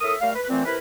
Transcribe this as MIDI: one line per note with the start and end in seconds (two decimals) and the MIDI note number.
0.01 0.14 45
0.01 0.14 69
0.01 0.14 70
0.01 0.14 76
0.01 0.14 87
0.21 0.30 55
0.21 0.30 57
0.21 0.30 70
0.21 0.30 77
0.35 0.47 71
0.49 0.61 46
0.49 0.61 52
0.49 0.61 57
0.49 0.61 60
0.64 0.77 48
0.64 0.77 64
0.64 0.77 70
0.64 0.77 71